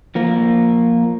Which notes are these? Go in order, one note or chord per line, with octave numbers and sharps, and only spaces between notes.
F3 A#3